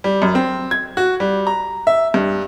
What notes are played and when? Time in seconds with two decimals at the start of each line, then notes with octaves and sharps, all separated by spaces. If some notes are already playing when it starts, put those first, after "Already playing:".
0.04 G3
0.22 F#2
0.35 C4
0.71 G#6
0.97 F#4
1.20 G3
1.47 A#5
1.87 E5
2.14 G2